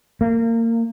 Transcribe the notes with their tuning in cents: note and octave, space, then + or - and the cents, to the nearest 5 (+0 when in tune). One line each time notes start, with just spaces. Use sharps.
A#3 -25